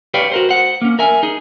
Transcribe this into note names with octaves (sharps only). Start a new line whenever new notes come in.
G4 B4 C#5 D5 F5 G5
F#4 A#4 C5
C5 F#5
A#3 C#4
A#4 E5 G#5
D#4 G#4